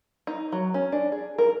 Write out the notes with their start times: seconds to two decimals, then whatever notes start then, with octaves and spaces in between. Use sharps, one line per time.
0.27 D#4
0.52 F#3
0.74 C#4
0.92 D4
1.12 G#4
1.38 A#4